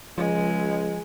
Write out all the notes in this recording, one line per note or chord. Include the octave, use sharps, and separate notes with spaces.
C#2 F3 G#3